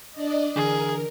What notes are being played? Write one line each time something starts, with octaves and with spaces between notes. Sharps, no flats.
D4 D5 D#5
D3 E3 D4 G#4 A#4